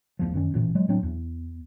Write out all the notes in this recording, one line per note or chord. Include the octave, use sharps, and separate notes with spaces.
F1 E2 F3
F#2 D#3 C#4
A1 A#2 E3
F#3 G#3
A2 F#3 C4 D4
E2